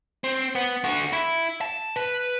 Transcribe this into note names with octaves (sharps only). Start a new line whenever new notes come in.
C4
B3
D3 F#4
E4
A5
B4